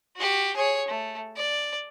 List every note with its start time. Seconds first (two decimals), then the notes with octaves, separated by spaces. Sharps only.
0.17 F#4 G4
0.56 G#4 C#5
0.88 A3
1.36 D5